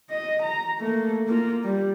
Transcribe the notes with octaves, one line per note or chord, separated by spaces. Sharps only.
D#5
A#5
A3 A#3
A#3 F4
G3